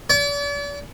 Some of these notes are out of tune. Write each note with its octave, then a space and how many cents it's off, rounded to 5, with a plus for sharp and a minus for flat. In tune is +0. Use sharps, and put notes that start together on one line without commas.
D5 -40